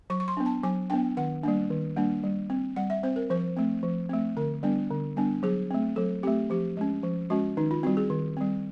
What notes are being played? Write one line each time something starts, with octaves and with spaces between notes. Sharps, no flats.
F#3 C#6
C#6
C6
B3 D4
A5
F#3 G#5
B3 D4 G5
D#3 F#5
G3 A#3 D4
D#3
G3 A#3 D4
G3
C4
G3 F#5
E5
C4 C5
A#4
F3 C5
A3 C4
F3
A3 C4
D3 A#4
G3 B3 D4
D3
G3 B3 D4
F#3 G#4
A3 C4
F#3 A4
A3 C4 G4
F3 G4
G#3 C#4
F3
G#3 C#4 F#4
D#3 D#4
F4
G3 C4 F#4
G#4
D#3
G3 C4